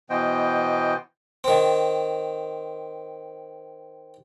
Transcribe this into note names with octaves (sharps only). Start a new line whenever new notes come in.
B2 E3 B3 C5 D#5 G5
D#3 C4